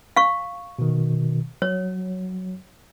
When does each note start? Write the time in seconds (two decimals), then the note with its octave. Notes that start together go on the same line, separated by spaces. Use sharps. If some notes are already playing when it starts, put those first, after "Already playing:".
0.16 F5 C#6
0.79 B2 D#3
1.62 F#3 C#5